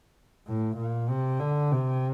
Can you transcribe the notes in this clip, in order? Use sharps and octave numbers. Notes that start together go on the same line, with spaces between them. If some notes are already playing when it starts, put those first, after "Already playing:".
A2
A#2
C3
D3
C3